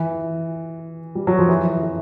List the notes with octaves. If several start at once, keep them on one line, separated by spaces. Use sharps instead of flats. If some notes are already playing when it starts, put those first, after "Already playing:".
Already playing: E3
G3
F#3
F3
E3
E3